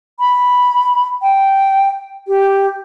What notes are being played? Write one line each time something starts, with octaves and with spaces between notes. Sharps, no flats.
B5
G5
G4